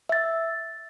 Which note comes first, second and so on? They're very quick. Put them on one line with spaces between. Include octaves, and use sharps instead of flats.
E5 A6 E6